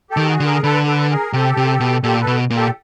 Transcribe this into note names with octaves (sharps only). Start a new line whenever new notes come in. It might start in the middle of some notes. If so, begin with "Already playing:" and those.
G4 A4
D#3
F#4 G#4
D3
G#4 A#4
D3 A4 B4
A4 B4
G#4 A#4
C3 G4 A4
C3
B2
A#2 G4 A4
A4 B4
B2
A#2
G4 A4